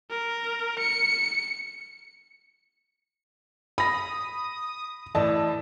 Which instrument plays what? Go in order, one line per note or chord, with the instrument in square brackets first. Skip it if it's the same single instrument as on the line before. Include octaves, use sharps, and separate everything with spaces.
[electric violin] A#4
C#7
[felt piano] B5 A#6 [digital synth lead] D#6
[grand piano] A2 D#5 A5 [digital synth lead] E3 [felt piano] D5